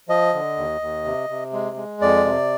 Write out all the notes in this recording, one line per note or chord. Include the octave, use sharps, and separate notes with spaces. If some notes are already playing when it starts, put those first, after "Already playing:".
F3 D#5
D3
D#2
D#2
C3
C3
G#3
G#3
F2 D5
C3